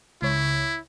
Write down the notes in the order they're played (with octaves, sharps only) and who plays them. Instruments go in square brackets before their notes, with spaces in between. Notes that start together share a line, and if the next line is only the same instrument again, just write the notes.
[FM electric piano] C#2 C#5 [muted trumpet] E4